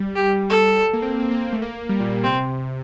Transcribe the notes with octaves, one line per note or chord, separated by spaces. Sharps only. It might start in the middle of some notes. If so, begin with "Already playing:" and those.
Already playing: G3
G4
G3 A4
A#3
C4
C4
A#3
A#3
A3
A#3
G3
A#2
A#2
C3 C4